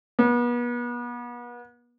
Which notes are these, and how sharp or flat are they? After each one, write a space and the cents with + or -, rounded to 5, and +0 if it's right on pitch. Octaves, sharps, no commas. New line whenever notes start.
B3 -35